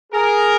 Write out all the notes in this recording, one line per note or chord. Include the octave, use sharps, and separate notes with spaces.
G#4 A#4